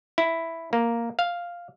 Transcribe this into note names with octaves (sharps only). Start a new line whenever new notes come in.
E4
A#3
F5